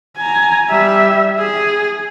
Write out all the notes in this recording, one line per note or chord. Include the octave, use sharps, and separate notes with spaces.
G#5 A#5
G3 E5
G#4